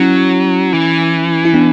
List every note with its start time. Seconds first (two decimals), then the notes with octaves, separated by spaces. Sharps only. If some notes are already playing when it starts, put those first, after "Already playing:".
Already playing: F#3 C#4 E4
0.73 E3
1.45 E4
1.54 B3 D4